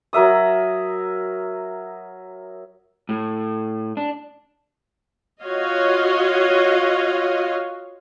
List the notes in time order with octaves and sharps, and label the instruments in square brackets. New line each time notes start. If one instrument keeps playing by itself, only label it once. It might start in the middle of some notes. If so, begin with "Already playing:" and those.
[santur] F#3 A#4 E5 D#6
[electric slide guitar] A2
D4
[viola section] F4 F#4 C#5 D#5 F5